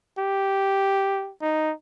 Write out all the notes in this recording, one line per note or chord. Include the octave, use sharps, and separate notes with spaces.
G4
D#4